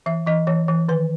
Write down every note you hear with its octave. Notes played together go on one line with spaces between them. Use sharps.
E3 E5
E3 D#5
E3 C#5
E3
D#3 B4